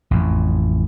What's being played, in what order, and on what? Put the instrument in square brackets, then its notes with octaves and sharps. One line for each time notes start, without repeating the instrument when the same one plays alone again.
[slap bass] A1 F2